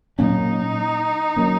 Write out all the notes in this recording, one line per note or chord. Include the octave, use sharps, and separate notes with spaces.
A#2 F#3 A#3 C#4 D#4
F#3 A#3 C#4